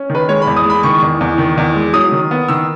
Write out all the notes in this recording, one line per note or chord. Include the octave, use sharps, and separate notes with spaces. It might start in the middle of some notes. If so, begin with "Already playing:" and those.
Already playing: C#4
D#3
B4
G#3 C#5
B5
E2
D#6
G#3 B5
D#3 C#6
E2
E2
D#3
E2
G#3
F#3 D#6
D#3
B3
D#3 E6